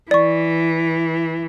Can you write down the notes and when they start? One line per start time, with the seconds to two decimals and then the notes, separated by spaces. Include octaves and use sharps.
0.11 E3 D5 C#6